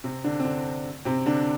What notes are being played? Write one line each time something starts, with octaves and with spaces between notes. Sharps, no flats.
C3 C4
D3 D4
C4
D3 D4
C3 C4
D3 D4